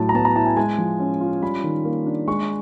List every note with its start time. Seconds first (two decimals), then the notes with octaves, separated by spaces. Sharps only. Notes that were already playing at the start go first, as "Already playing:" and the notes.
Already playing: A2 F#3 A5
0.09 A#5
0.14 B3 A5
0.25 A#5
0.36 E4 A5
0.46 G#5
0.57 G#3 G#5
0.78 F3
1.00 C#4
1.21 F4
1.43 G3 B5
1.64 D#3
1.85 A#3
2.06 D4
2.27 G#3 C#6